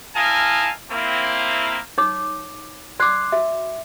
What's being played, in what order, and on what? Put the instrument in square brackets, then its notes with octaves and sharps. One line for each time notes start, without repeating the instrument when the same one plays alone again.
[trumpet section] E4 A#4 D#5 F5 G#5 A5
A#3 C4 E4
[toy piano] D#4 C#5 D6
[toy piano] D5 D6 [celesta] C6 F#6 C7
[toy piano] F#4 [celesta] E5